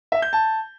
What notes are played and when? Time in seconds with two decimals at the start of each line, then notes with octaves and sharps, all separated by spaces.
0.12 E5
0.22 G6
0.33 A5